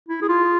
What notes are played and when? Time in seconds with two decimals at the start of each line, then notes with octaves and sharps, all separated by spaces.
0.09 E4
0.22 G#4
0.29 F4